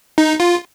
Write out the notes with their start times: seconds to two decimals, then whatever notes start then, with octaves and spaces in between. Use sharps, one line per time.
0.18 D#4
0.40 F4